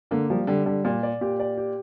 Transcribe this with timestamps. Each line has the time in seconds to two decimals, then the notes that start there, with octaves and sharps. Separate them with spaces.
0.11 D3 A#3
0.30 F3 G3
0.47 D3 G3
0.66 D3 G3
0.84 A#2 D5
1.03 D5
1.21 A#2 G4
1.39 D5
1.57 G4